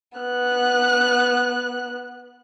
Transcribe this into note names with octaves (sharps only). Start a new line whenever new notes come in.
B3 F#6